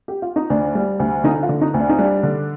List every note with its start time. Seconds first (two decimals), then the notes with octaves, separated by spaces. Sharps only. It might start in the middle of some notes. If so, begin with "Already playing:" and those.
0.08 G4
0.22 F4
0.36 D#4
0.50 D2 D4
0.75 G3
1.00 D2
1.24 D3 D#4
1.43 F4
1.49 D3
1.61 D#4
1.74 D2
1.80 D4
1.89 D#4
1.99 G3 D4
2.23 D3